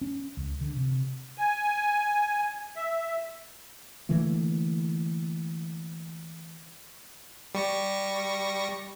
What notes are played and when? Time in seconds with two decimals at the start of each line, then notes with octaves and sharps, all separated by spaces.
0.01 C#4
0.37 C#2
0.61 D3
0.76 C3
1.38 G#5
2.76 E5
4.09 D3 E3 A3 A#3
7.55 G3 C#6 A#6